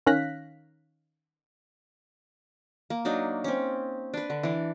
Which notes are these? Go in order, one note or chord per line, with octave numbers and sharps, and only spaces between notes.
D#3 C#4 F5 F#6 A#6 B6
A#3
F#3 D4 D#4
C4 C#4
D4 B4
D3
E3 D4